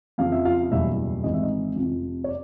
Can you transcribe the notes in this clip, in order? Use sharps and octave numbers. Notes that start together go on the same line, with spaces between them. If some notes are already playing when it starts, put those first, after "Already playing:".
F2 C#3 F3 F5
E5
F4 F5
F#1 E2 B2 G3 E4 E5
G#1 G#2 E3 D#5
E5
D#4 D#5
F1 F2 C3 F3
C#5
D5